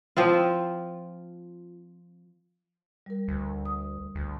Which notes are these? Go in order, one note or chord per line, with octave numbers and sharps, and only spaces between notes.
F3 C4 F4
G3 A#4
D2
D#6
D2